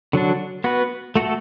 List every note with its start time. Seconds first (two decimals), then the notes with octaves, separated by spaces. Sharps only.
0.13 D3 F#3 D4
0.64 B3 F#4 B4
1.16 A3 F#4 A4